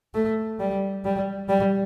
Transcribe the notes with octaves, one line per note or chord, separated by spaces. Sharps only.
A3
G3
G3
G3